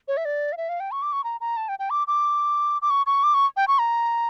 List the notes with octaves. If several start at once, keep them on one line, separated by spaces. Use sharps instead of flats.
C#5
E5
D5
F5
E5
F5
G5
C#6
D6
C#6
A#5
A#5
A5
G5
G5
D6
D6
D6
C#6
C#6
D6
C#6
G5
C#6
A#5